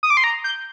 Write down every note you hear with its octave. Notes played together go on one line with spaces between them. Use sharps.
D#6
D6
C6
A#5
G6